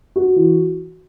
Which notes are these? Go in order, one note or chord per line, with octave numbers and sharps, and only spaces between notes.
F#4
E3